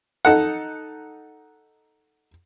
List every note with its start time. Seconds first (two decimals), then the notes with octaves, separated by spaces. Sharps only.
0.25 D#4 A4 F#5